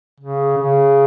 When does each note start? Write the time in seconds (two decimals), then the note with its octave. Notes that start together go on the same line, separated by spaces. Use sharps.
0.20 C#3
0.58 C#3